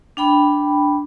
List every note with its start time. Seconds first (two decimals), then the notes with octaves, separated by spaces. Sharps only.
0.17 D4 G5 B5